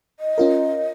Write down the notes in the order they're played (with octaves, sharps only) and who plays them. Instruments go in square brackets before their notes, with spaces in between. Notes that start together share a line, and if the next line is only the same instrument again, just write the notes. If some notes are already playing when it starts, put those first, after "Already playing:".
[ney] D#5
[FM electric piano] C#4 F4 A#4